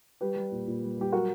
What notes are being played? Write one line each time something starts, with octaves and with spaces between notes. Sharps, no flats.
G3 G4 B4
G3
A#2
A#2
G3
G3 G4
F#3 F#4 A#4